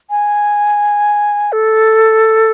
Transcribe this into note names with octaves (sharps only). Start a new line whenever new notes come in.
G#5
A4